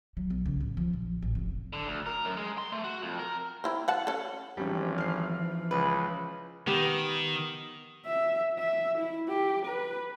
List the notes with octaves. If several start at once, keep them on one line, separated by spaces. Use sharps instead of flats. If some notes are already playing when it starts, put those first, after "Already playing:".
F#3
B1
C#2
A1
F3
A#1
A1
F1
D3
D2
A#4
F#2
G#3
C6
A3
F#4
F2
A#4
C4 E4 C5
F5 F#5 A5
C#4 A4
G#1 E3 F3 G3 C#4
F6 C7
C#2 B4
D#3 B3 G4 B4
E5
E5
E4
G4
B4